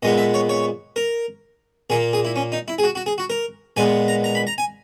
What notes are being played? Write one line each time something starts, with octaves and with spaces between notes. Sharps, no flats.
A#2 G#3 B3 D#5
E5
C#5
C#5
A#4
A#2 A#3 G#4
G#4
E4
C#4
D#4
E4
G#4
F#4
F#4
G#4
F#4
A#4
A#2 G#3 B3 G#5
A#5
A#5
B5
A#5
G#5